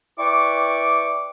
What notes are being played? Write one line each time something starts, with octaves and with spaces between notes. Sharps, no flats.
E4 B4 D5 G5 C#6 D6